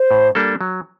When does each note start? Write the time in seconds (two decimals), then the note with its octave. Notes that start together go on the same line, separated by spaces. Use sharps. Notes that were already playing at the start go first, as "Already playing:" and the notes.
Already playing: C5
0.11 A2
0.35 G3 A#3 D4 A4
0.61 F#3